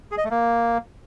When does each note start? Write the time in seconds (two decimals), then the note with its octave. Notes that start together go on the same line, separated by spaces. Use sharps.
0.11 G#4
0.18 D#5
0.24 A3
0.31 A#3